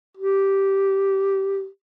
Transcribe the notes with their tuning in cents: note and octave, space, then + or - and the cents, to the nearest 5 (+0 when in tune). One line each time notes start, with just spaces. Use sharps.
G4 -10